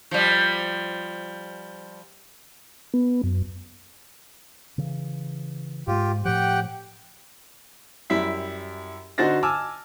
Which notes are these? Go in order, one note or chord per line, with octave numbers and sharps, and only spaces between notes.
F3 G3
B3
F#2
C#3 E3
G#2 G#3 F4 G4
A2 F3 G4 F#5 G5
F#2 G3 E4 B6
D3 D#4 F#4 C5 A6 A#6
G#5 A5 D6 E6 F6